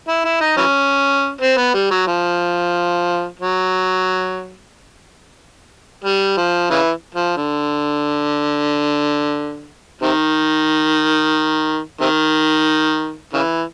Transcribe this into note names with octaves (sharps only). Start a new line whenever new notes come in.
E4
E4
D#4
E3 F#3 C#4
C4
B3
G3
F#3
F3
F#3
G3
F3
C#3 E3
F3
D3
C3 D#3
C3 D#3
C#3 E3